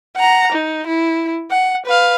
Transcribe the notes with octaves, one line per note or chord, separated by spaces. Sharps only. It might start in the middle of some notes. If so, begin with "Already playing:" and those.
F#5 A#5
D#4
E4
F#5
B4 F5